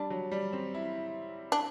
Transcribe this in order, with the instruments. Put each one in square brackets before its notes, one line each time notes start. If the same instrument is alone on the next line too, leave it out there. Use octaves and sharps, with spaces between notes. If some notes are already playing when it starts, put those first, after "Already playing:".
Already playing: [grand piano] G3 [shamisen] D4
[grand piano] F#3
G3
C4
E4
[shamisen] D4